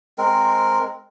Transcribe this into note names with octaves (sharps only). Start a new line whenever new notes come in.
G#3 C4 A#4